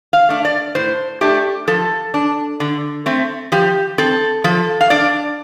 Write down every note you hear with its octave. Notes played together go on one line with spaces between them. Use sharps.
F5
A3 D4
D5
A2 C5
A3 D4 G4
F3 A4
D4
D3
A3 C4
F3 G4
C4 A4
F3 A4
F5
D4 D5